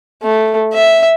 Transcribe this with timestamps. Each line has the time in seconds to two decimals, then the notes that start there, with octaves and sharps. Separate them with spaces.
0.23 A3
0.74 E5